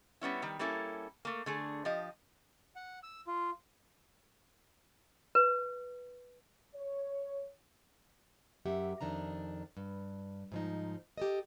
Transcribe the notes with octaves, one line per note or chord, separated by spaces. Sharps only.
G3 B3 C#4 E4
D#3 G3
G3 A#3 C#4 E4 A4
A3 A#3
D3 A3 G#4
F3 G4 D#5
F#5
E6
F4
B4
C#5
F#2 G4 E5 F#5
F2 D#3 D4 A#5
G2
G#2 F3 D#4
G4 A4 D#5